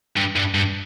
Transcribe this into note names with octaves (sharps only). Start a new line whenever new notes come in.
G2
G2
G2